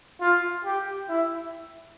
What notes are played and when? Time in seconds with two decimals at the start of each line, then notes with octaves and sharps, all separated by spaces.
0.21 F4
0.65 G4
1.09 E4